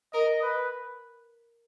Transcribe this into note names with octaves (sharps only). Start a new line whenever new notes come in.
A#4 D#5
B4